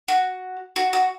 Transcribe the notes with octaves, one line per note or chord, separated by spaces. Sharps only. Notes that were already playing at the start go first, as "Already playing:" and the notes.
F#4
F#4
F#4